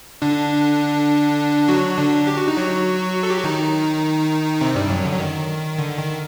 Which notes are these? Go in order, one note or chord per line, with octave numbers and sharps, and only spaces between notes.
D3 D4
F#3 F#4
D3 D4
G4
F#4
D#4
F#3 F#4
A4
G4
F#4
D#3 D#4
C3 C4
G2 G3
F#2 F#3
D3
F#3
D#3
D3
D#3